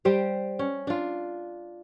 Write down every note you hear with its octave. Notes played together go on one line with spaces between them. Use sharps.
G3 G4 C5
C#4
D4 F4